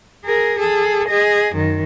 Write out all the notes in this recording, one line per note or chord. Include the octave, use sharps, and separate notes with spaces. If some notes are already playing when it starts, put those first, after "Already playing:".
G#4 A#4
G#4 A4
G#4 D#5
F#2 D#3